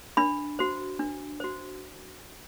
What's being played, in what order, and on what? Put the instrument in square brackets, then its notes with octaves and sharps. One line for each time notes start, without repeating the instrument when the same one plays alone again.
[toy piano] D4 B5
F#4 C5
D4
F#4 C5